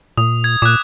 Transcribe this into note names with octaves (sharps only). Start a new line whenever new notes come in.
A#2 D#6
G#6
A#2 D6 F#6